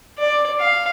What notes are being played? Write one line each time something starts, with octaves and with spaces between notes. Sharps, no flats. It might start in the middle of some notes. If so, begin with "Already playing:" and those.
D5
F5